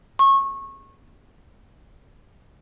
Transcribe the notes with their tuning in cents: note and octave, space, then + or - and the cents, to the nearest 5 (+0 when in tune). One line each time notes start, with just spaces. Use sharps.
C#6 -25